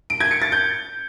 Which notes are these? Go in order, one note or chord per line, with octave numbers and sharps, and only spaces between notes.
D7
G#6
C#7
A6
G6